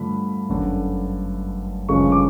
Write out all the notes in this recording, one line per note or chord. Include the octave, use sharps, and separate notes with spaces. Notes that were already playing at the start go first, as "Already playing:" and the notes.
Already playing: G2 D3 F3 A3 B5
G1 F#2 D3
G1 F#2 C#3 F3 G#3 C#6
D6